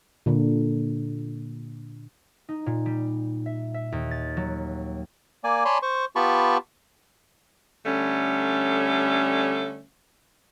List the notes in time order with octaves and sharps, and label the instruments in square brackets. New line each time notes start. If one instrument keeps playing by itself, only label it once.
[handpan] A#2 D3
[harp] D#4
A#2
G3
E5
E5
D#2
A6
F#3
[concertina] A#3 D5 G#5
C#5 D5 G#5 A5 B5 C6
C5 C#6
B3 F4 G4 A5 B5 C#6
[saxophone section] D3 G3 A3 C#4